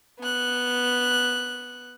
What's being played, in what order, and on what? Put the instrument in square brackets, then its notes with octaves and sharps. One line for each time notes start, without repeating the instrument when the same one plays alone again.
[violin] B3 F#6